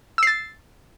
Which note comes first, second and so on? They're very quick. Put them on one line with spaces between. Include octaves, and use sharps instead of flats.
E6 C7 A6